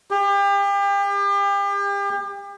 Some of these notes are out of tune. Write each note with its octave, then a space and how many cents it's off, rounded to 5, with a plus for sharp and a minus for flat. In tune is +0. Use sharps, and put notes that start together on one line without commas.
G4 +35